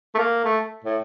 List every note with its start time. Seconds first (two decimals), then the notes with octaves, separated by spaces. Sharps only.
0.15 A3
0.19 A#3
0.45 A3
0.84 A2